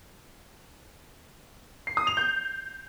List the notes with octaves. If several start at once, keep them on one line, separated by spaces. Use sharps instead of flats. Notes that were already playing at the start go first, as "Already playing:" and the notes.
C7
D#6
F7
G6